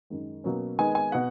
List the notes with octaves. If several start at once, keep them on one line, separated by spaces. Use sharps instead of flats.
F#2 D#3 G#3
B2 F#3 A#3 C#4
D#3 G#3 B3 D#4 G#5
G#5
B2 F#5